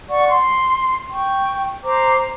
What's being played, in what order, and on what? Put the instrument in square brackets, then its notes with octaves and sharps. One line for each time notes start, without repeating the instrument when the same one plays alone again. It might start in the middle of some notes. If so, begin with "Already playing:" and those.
[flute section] D5 F#5 C#6
C6
G5 C#6
C5 A#5 D6